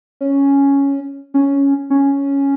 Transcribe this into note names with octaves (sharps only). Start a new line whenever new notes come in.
C#4
C#4
C#4